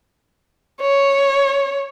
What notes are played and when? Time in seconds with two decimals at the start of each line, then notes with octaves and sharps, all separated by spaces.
0.81 C#5